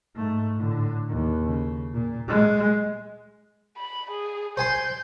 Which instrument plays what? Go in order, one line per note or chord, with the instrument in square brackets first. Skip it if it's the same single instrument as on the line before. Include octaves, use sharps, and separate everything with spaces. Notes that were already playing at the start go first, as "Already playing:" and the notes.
[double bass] G#2 A3
A2 D3
D#2
C#3
A#2
G#3
[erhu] B5
G#4
[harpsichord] C5 G#5 C6 [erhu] G6